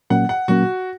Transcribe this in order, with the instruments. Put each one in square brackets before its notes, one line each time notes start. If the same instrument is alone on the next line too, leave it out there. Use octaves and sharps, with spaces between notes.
[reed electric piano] A#2 F#3 A#3 C#4 [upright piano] F#5
[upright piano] F#5
[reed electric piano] A#2 F#3 A#3 C#4 [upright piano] F#4